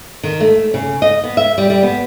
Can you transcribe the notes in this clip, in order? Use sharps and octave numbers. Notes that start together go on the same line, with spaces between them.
D#3
A3
C#3
D#5
B3
E5
G3
G3
B3